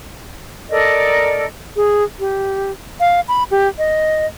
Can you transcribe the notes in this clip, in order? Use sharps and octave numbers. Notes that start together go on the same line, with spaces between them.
A4 A#4 D5 D#5
G#4
G4
F5
B5
G4
D#5